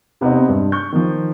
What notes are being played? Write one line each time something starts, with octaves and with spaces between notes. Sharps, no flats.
C3 B3 C4 D#4
G2
C#6 G6
D#3 F3